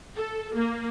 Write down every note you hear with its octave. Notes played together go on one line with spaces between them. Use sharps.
A4
A#3